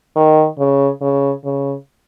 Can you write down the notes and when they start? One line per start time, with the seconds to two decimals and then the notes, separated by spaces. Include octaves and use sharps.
0.16 D#3
0.59 C#3
1.01 C#3
1.45 C#3